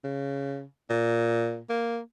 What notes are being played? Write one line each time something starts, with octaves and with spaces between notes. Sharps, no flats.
C#3
A#2
A#3